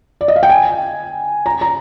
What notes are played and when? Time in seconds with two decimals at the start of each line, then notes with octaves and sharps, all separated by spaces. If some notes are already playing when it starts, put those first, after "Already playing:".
0.21 D5
0.28 D#5
0.36 F5
0.43 G5
0.50 G#5
1.46 A#5
1.61 A#5